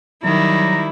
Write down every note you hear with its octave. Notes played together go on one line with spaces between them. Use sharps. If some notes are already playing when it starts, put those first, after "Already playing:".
D#3 F#3 G3 E4 A#5